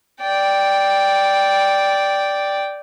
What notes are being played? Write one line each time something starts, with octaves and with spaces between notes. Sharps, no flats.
D5 G5